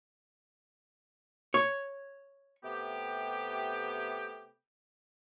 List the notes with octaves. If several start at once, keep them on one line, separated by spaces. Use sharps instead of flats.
C#5
C3 A3 B3 G4